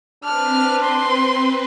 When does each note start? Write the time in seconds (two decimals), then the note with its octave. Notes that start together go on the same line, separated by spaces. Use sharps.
0.24 C4 D4 B4 F6
0.83 C6